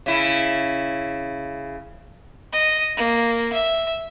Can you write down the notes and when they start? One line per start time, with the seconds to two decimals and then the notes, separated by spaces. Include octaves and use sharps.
0.06 C#3 E4
2.53 D#5
2.97 A#3
3.53 E5